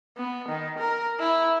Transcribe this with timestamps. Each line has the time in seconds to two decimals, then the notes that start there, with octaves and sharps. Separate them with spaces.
0.17 B3
0.48 D#3
0.79 A#4
1.20 E4